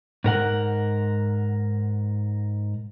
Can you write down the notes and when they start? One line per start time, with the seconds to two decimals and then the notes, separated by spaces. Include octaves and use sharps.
0.24 G#2 A#4 F#5